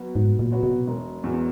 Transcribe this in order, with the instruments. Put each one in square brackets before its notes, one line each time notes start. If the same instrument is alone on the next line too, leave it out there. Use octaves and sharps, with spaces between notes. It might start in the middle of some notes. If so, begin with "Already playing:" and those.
Already playing: [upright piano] B2 F#3 B3 F#4
[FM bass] G#2 [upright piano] B2
[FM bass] A#2
[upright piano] F#3 B3 F#4 C#5
[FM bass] B2
[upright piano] E1
E2 B2